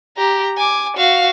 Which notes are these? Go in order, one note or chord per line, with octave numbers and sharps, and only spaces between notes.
G4 A#5
G#5 D6
F#4 F5